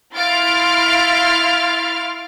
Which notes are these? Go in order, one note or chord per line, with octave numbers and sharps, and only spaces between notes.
E4 F5 C6 F6 A6 D7